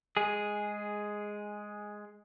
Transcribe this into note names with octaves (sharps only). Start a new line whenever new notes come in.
G#3 G#4